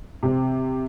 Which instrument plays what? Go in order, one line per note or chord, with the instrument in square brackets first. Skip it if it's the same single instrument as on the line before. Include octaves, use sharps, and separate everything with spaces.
[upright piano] C3 C4